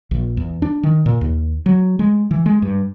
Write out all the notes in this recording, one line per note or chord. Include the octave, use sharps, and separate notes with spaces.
A#1
E2
D4
D#3
A#2
D#2
F#3
G#3
E3
G#3
G2